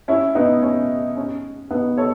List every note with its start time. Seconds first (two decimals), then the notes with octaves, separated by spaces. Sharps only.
0.08 C#4 E4
0.35 B3 D#4
0.62 C#4
1.16 C#4
1.70 B3 D#4
1.97 A4 C#5